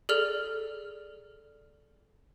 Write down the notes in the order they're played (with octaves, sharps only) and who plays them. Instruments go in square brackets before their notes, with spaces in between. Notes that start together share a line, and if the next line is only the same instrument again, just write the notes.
[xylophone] G#4 A4 D5 F6 F7